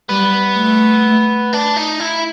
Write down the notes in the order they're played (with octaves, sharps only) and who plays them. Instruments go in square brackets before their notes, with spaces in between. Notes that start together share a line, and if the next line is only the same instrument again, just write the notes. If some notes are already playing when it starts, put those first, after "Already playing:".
[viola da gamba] G3 [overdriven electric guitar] B3
[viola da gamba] A3
[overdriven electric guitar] D4
D#4
E4